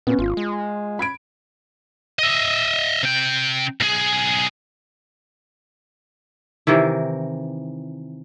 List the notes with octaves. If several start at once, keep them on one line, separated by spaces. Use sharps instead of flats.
A#2 B3 C#4
G#1 F4
G#3
B5 G#6 D7
D#5 E5
C3 G5
B1 G#4
C3 D#3 E3 E4